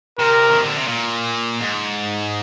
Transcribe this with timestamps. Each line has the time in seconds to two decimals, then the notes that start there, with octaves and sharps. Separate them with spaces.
0.19 C3 A#4
0.51 D#3
0.64 D3
0.77 C3
0.88 A#2
1.60 G#2